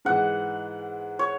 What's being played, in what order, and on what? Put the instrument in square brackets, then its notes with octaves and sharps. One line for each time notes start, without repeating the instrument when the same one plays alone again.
[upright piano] G#2 E3 G#3 [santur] F#5
[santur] C#5